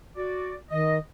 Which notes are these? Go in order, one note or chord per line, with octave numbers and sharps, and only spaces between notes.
F#4 D5
D#3 D#5